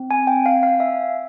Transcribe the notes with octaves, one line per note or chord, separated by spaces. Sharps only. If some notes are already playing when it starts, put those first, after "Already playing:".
Already playing: C4
G#5
G5
F5
F5
E5